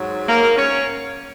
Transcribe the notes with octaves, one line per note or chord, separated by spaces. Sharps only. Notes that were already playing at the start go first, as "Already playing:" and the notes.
Already playing: G#2 F#3
A#3 A#4
C#4 C#5